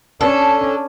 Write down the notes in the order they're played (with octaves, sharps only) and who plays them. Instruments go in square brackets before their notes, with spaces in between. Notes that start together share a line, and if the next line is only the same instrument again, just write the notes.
[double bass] C#4 D4 [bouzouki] A4